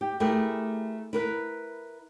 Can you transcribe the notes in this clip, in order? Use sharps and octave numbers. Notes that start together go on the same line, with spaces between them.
G4
A3 E4 G4 G#4 A#4
E4 A#4 B4